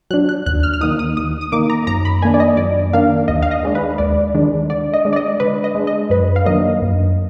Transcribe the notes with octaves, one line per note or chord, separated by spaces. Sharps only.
F#3 D4 F#6
F#6
D#2 F#6
F6
F6
D#3 A#3 D#4 D#6
D#6
D#2 D#6
D#6
D#3 A#3 D#4 D6
A#5
F#2 A#5
B5
D#3 A#3 D4 G#5
D5
D#5
F#2 D5
D#3 A#3 D4 F5
D#2 D#5
F5
D#5
D#3 G#3 D4
B4
D#2 D5
D#3 G#3 D4
D3 D5
D#5
G#3 D4
D5
D#5
D3 B4
D#5
G#3 D4
D#5
F#2 B4
F5
D#3 F#3 A#3 D4 D#5
F#2